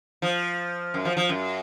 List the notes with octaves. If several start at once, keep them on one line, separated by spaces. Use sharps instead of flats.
F3
F#2
F3
F3
F#2